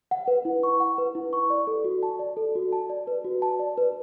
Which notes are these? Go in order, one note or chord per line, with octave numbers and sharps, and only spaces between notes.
F#5
B4
E4
C#6
F#5
B4
E4
C#6
D5
A4
F#4
A5
D5
A4
F#4
A5
D5
B4
F#4
A5
D5
B4